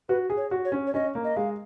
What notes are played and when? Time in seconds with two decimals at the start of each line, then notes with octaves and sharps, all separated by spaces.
0.09 F#4 B4
0.30 G#4
0.37 C#5
0.51 F#4
0.65 C#5
0.72 C#4
0.87 C#5
0.94 C#4 D#5
1.15 A#3
1.24 D#5
1.36 G#3 F5